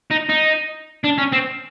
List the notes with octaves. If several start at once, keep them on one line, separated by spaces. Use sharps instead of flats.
D#4
D#4
D4
C#4
C4